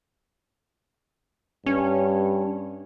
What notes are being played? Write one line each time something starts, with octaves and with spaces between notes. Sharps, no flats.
G2 C#4